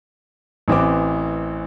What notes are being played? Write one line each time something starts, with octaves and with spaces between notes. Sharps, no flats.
A1 E3 C4 D6